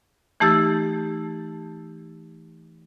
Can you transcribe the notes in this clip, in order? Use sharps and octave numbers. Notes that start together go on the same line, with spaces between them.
E3 A3 D#4 G4 E6 A6